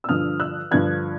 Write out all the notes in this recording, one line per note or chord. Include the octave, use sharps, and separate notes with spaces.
E6
G2 D3 F3 D#6 F6
E6 F#6
G2 D3 F3 F#6 G#6